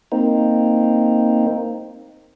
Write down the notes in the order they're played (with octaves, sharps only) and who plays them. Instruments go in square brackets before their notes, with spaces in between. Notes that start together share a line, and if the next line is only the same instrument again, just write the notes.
[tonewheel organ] A#3 C4 D#4